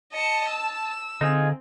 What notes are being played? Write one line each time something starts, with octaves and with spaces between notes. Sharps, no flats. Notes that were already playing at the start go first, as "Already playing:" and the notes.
D#5 A5 C#7
E6
D3 C4 D#4 F4 G#4